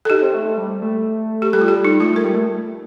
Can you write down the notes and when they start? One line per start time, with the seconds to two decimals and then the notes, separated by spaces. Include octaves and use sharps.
0.05 A4
0.10 D#4 G4
0.22 C4
0.34 A3
0.45 A3
0.58 G3
0.82 A3
1.42 G4
1.53 G3 A4
1.61 F4
1.68 G4
1.76 G3
1.85 D#4
2.00 A3 F4
2.16 A#4
2.24 G3
2.34 A3